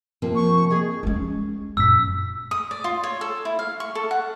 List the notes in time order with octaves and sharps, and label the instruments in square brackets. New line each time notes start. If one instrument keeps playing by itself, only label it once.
[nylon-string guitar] C3 F3 A#3
[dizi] C#6
[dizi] G#4 [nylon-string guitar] D#5
[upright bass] G#3 C#4
[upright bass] F#2 A#2 [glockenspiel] E6 B6
[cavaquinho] D#6
D5
F4
C#5
A4
E4
F5
C#6
A4
F#5